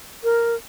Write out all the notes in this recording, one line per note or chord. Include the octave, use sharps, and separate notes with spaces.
A#4